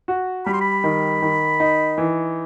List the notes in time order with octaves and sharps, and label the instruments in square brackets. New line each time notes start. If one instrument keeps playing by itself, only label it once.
[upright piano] F#4
[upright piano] G3 [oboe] B5
[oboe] C6
B5
[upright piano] D#3
D#3
D#4
E3